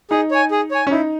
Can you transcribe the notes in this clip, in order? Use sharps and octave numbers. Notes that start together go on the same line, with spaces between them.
D#4 G#4
C#5 G#5
G#4
C#5 G#5
C#4
D#4 E4